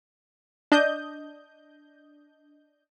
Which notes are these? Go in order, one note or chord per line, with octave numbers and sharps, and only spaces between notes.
D4 D#5 G6